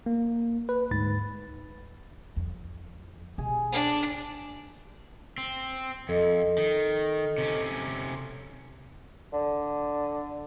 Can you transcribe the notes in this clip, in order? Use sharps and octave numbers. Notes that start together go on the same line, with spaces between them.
A#3
B4
D2 G#2 B5 A6
F2
B2 G#4
D4
C4
F2 A4 D#5
D#3
C3 C#4
D3